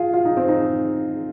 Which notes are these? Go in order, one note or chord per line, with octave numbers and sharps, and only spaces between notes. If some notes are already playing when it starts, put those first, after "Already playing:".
Already playing: F4 G#4
F4
D#4
C4
D#4